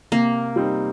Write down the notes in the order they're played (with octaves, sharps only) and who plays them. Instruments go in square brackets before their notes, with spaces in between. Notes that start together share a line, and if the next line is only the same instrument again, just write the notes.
[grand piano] C3 [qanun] A#3
[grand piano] G3 C4 D#4